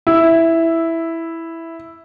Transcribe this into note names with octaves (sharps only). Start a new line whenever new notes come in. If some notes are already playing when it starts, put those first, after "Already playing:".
E4